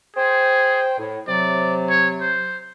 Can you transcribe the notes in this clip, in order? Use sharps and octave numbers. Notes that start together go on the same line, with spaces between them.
G#4 C5 G5
A2
C3 F#3 D5
C#5
C5